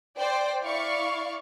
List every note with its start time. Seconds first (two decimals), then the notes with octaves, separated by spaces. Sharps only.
0.18 C5 D5 G5
0.61 E4 D5 F5 C#6